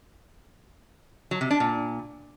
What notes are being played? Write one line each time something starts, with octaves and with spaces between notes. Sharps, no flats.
F#3
C3
D4
A#2